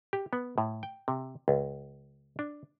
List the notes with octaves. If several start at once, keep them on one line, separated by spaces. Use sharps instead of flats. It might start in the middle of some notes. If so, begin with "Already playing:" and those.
G4
B3
A2
G5
C3
C#2
D4